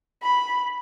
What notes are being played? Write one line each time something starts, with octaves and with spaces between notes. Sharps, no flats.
B5